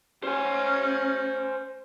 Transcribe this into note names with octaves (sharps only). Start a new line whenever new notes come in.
C#4 C5 G#5